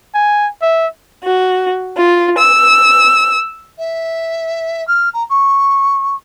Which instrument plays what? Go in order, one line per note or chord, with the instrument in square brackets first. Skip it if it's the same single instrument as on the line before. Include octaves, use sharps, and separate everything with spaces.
[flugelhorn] G#5
E5
[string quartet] F#4
F4
E6
[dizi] E5
F6
A#5
C#6